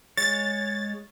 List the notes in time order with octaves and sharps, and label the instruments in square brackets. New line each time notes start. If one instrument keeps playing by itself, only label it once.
[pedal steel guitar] G#3 C#5 [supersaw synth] A6